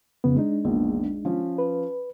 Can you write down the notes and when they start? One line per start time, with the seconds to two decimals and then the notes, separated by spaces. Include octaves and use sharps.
0.24 F2 C#3 B3
0.36 G#3 D4 D#4
0.64 A#1 E2 A#2
1.25 F3 C#4
1.58 B4